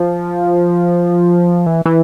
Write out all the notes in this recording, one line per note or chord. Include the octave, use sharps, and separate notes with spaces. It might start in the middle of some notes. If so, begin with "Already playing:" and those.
Already playing: F3
E3
E3